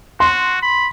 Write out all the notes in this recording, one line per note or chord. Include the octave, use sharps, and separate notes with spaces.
F#4 C6
B5